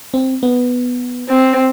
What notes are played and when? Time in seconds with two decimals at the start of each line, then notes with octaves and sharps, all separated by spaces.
0.14 C4
0.43 B3
1.29 C4